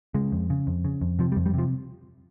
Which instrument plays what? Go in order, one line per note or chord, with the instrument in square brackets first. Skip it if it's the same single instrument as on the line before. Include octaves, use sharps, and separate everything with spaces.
[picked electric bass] C#3 G#3
F2
C#3
F2
C#3
F2
C3 F3
G3
F2
G3
C3 F3